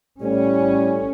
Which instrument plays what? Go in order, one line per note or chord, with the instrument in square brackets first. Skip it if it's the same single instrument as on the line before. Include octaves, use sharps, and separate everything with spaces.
[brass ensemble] A2 G3 [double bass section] C#4